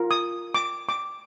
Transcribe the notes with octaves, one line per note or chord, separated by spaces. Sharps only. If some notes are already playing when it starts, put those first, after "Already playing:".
Already playing: F4 A#4
D#6
D6
D6